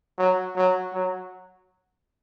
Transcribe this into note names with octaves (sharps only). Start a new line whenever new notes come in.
F#3
F#3
F#3